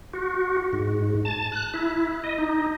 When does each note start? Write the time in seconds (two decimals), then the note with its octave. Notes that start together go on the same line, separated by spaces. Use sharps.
0.14 F#4
0.73 G#2
1.25 A5
1.52 F#6
1.74 E4
2.24 D#5
2.38 D#4